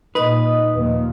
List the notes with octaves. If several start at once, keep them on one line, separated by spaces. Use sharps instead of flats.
A#2 D#4 B4 D#5 D#6
D#2 A#2 F3